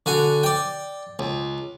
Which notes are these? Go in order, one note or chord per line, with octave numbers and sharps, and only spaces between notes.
D3 F#4 G#5
D5 G5
C#2